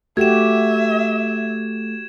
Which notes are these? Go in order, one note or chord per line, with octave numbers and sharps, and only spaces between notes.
A3 F#4 G4 E5 G#6 E7